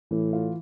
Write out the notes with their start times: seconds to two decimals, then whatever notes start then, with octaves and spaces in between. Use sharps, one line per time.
0.11 A2 E3
0.33 F4